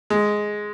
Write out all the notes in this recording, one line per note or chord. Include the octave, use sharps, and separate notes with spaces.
G#3